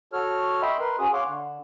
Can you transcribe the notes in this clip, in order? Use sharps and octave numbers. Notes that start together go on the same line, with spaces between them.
F#4 A4 C#5 F6
D#5 E5 G5 B5 C6
A#4 B4 C6
C#4 F#4 G#4 D#6
C#5 F5 F#5 C6 D6
D3